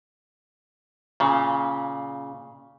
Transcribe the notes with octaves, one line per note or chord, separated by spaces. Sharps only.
A#2 C#3